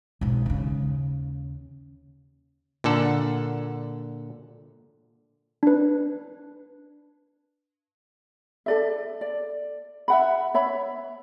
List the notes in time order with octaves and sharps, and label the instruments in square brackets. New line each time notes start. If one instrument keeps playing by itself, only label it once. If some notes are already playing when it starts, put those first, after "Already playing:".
[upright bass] B1 G#2
D#2 C#3
[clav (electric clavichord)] A#2 D3 A4 F#5
[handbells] D4 B4
[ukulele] A4 D5 E5
D5
E5 F#5 B5
C#5 E5 B5